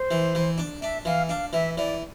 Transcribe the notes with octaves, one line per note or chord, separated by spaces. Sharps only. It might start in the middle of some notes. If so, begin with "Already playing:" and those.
Already playing: C5
E3
E3
D4
D4 E5
E3 F5
D4 F5
E3 E5
E3 D5